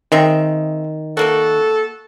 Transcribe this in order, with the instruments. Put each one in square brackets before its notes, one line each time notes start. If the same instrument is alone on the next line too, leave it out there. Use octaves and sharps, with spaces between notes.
[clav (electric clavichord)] D#3 [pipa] G#3 C4 E5
[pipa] A3 A#3 F#4 [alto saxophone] A4